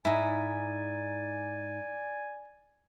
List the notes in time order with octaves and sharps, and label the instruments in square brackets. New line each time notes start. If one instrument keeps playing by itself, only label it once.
[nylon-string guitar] G#2 [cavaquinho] D#4 E4 [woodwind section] D5 G#5